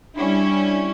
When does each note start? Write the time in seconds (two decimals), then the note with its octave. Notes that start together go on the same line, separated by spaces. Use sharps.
0.17 G3 C#4 D4 E4